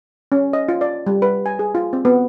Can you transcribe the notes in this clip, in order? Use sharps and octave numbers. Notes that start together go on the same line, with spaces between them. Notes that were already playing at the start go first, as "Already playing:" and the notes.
C#4
D#5
F4
D5
G3
B4
G#5
G#4
F4
C4
B3